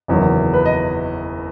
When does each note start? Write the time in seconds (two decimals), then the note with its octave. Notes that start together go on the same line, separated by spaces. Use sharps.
0.08 F#1 E2 D#3 F#3
0.54 B4
0.65 D#5